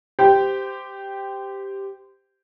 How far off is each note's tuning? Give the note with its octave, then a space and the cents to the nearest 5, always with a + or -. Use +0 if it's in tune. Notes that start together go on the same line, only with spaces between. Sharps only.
G4 +0 C5 -20 G5 +0